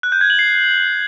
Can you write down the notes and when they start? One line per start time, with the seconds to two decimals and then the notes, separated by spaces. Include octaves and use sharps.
0.03 F#6
0.12 G6
0.21 G#6
0.30 F#7
0.39 C7